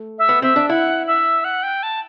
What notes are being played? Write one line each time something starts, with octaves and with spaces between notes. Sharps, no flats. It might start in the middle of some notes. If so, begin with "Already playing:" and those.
Already playing: A3
E5
B3
C4 E5
D4
E4 F#5
E5
F#5
G5
A5